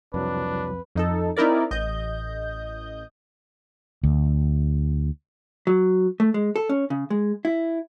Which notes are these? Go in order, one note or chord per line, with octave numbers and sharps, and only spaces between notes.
C2 F2 F#3 D4 B4
F2 D#4 A4
C4 D#4 E4 A#4 D5
A1 D#5 G6
D2
F#3
A3
G#3
A4
C#4
C#3
G#3
E4